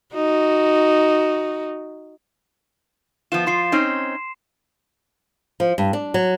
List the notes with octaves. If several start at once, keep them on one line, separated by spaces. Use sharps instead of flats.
D#4 F#4
F3 B3 F4 E7
F3 F4 C6 C7
C4 C#4 D#4
F3
G2
D4
F#3